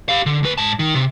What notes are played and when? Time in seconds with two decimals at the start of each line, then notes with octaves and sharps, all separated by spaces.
0.09 G4 F5
0.26 D3
0.43 D2 B4
0.58 G#2 A5
0.79 D#3
0.95 C3